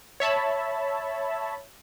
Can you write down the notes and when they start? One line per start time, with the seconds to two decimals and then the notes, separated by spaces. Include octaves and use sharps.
0.20 C#5 E5 A5 B5